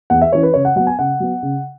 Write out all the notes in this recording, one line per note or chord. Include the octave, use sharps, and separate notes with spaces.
E2 F#5
E5
E3 C#4 C#5
B4
C#3 C#5
F#5
F#3 B3 F#5
G#5
C#3 F#5
F#3 B3
C#3